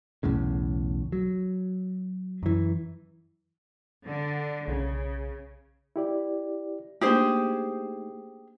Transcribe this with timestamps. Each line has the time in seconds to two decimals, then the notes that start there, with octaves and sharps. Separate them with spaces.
0.23 B1 E2 A2 C#3
1.12 F#3
2.43 F#2 E3
4.03 D3
4.68 B1 C#3
5.96 E4 G4 D5
7.01 A3 A#3 D4 D#4 G4 G#4 B4 C5